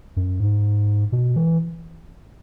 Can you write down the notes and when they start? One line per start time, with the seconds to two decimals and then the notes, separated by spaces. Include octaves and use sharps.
0.16 F#2
0.40 G#2
1.12 B2
1.36 E3